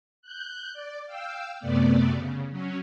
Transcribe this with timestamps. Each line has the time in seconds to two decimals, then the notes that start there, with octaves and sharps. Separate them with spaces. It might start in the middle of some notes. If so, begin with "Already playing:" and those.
0.22 F#6 G6
0.73 D5
1.06 F5 G5 E6
1.60 F#2 C3 A3 B3 D5
2.14 C#3
2.51 F#3 C#4